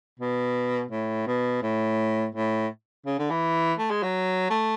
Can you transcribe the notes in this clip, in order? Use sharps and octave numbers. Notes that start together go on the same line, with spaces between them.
B2
A2
B2
A2
A2
C#3
D3
E3
A3
G#3
F#3
A3